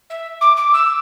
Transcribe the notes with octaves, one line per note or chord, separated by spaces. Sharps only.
E5
D6
D6
E6